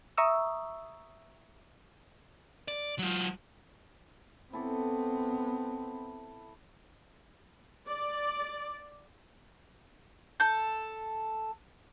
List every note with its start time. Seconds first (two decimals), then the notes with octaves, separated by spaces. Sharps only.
0.17 E5 A#5 C#6 D#6 E6
2.68 D5
2.99 F#3 F4
4.53 B3 C4 E4 A4 D6
7.88 D5
10.40 A4 G6